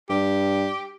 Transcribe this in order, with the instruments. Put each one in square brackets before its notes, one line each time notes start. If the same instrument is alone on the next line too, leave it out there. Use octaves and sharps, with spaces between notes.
[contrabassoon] G2 [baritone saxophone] G4